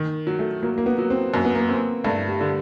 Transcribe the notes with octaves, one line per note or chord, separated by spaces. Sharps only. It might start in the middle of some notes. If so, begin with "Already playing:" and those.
Already playing: D#3
F#3
A3
F#3 A#3
A#3
B3
F#3
C4
F#2 A#3
B3
A#3
C4
G2 A3
G3
D3